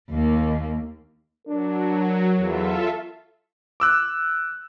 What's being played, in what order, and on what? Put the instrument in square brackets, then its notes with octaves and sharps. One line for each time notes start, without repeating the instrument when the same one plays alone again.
[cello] D#2 A#3
[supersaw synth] F#3 [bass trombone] D4 [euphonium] A#4
[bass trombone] E2 [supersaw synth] F4 A4 E5
[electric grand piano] D6 E6 F#6